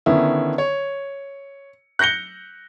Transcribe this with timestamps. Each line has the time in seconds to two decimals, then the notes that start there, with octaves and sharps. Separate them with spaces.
0.06 D3 D#3 B3 C#4 E4
0.58 C#5
1.99 F#6 G6 A#6 C#7 G7